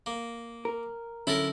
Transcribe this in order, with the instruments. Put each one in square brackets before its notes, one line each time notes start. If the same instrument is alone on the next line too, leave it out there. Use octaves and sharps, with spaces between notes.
[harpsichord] A#3
[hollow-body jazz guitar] A#4
[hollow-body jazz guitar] D3 F#3 C#4 [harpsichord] E4 A4 A#4